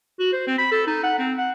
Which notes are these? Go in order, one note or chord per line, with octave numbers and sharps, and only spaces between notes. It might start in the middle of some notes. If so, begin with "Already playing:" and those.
F#4
C5
C4
B5
A4
D#4
F#5
C4
F#5